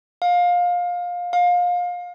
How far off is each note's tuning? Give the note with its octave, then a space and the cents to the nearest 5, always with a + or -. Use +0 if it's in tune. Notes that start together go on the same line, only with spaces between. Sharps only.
F5 +20
F5 +25